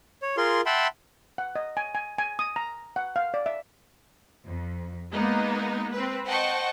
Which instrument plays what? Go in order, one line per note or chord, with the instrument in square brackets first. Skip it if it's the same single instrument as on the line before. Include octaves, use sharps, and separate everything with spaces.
[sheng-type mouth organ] C#5
F4 G#4 A#4 C6
E5 F#5 G5 A5 B5 C6
[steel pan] F#5
D#5
G#5
G#5
G#5
D#6
A#5
F#5
F5
D5
E5
[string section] F2
G#3 A#3 B3 D#4
C4 B4
C5 D#5 F#5 G5 A5 C#6